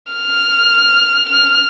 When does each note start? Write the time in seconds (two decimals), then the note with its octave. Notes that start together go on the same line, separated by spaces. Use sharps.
0.12 F6
1.29 F6